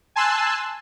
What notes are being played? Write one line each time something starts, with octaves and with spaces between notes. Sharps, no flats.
G#5 A5 C6 E6 F#6